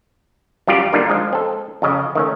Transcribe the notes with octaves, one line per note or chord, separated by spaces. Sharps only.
F#2 G3 F4 G4 D5
D3 G3 A#3 D4 D#4 F4
F3 G#3
C4 A4
F2 C#3 D#5
D#3 A3 C#4